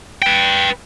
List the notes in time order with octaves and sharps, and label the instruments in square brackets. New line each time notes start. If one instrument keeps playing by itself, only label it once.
[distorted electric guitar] B4 G5